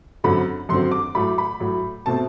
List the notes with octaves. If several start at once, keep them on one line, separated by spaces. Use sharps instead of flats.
F#2 D3 F#3 C4 B5
F#2 D3 F#3 C4 C6
D6
A2 F#3 A3 B5
B5
A2 F#3 A3
B2 A3 C4 A5